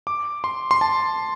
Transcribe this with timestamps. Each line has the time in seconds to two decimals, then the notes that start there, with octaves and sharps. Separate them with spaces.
0.07 D6
0.44 C6
0.71 C6
0.81 A5